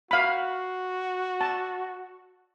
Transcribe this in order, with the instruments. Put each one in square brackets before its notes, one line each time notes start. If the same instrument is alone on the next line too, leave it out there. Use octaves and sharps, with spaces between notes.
[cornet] F#4 [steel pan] F5 B5
[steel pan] A5